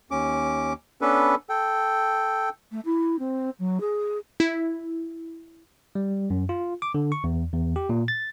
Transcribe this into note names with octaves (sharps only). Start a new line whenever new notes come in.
D#2 C#4 D6
B3 C#4 D4 A4 B4
A4 G5
A3
E4
C4
F#3
G#4
E4
G3
F#2
F4
D6
D3
C#6
E2
E2
G4
A#2
A6